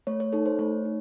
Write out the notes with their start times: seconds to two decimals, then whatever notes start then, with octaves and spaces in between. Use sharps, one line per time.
0.07 A3 C#5
0.20 C#5
0.33 D#4 A4 C#5
0.46 C5
0.59 A3 C#5
0.85 D#4